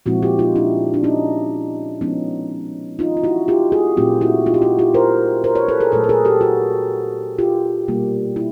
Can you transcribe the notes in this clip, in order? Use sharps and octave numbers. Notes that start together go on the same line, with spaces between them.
A#2 F3 G#3 C4 E4 F#4
F4 G4
D#4 F4
D4 E4
D4
C#4 D#4
F3 G#3 B3 C#4 D#4
D#4 F4
F4
E4 F#4
F4 G4
F#4 G#4
A#2 F#3 A3 C4 F4 G4
E4 F#4
D#4 F4
G4
E4 F#4
F4 G4
A#4 C5
A#4 C5
B4 C#5
A4 B4
G#4 A#4
A#2 F#3 A3 A4 B4
B4
G#4 A#4
G4 A4
F#4 G#4
F4 G4
B2 G3 A#3
E4